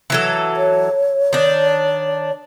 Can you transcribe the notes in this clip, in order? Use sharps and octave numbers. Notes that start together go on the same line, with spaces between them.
E3 F#3 A4
C#5
D#3 D4